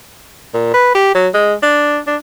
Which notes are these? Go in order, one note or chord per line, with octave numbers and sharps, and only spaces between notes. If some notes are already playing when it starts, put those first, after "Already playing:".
A#2
B4
G4
F#3
G#3
D4
D4